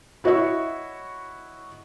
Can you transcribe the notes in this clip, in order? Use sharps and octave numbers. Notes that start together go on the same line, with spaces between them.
E4 F#4 C#5 D#5 E5 C#6